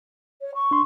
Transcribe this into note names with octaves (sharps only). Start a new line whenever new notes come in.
C#5
C#6
D4 C6